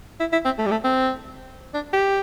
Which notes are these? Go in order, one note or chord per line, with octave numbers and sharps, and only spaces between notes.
E4
E4
C4
A3
G3
A3
C4
D4
G4